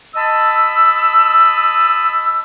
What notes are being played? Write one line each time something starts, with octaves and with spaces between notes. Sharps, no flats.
D#5 A5 B5 E6